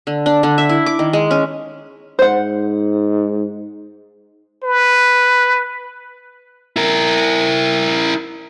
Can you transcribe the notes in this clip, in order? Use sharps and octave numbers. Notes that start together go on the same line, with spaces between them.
D3
D4
D3
E5
E4
D6
D#3
G#3
C#4
G#2 C5 F#5
B4
E4 A#4